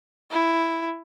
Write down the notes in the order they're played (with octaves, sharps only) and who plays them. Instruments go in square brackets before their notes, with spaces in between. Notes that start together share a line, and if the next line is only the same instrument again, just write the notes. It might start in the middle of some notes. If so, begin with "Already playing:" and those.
[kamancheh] E4